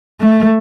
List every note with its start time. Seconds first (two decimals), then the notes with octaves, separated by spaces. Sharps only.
0.19 A3